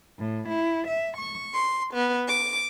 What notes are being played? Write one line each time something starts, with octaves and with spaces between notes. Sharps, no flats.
A2
E4
E5
C#6
C6
B3
D6